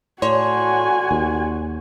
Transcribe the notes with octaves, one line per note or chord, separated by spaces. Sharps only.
A2 F#4 A4 C#5 D5 G#5 C6
D#2